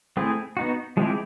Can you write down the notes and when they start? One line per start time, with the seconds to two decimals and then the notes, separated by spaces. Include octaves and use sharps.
0.17 A3 C4 E4 G#4
0.57 B3 D#4 F#4
0.97 F3 G#3 C4 E4 G4